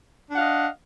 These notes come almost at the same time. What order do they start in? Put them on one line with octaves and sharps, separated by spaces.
D4 F#5 F5 D#5